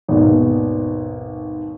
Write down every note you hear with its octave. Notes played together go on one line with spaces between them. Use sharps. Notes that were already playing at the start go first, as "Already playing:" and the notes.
G#1 D#2 B2